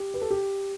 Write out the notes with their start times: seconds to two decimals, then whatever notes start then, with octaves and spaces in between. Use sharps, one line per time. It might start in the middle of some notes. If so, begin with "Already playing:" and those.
Already playing: G4
0.14 B4
0.22 A4
0.31 G4